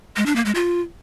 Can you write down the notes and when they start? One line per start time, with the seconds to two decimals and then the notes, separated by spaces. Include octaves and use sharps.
0.16 G#3
0.26 D4
0.36 A#3
0.45 G#3
0.55 F4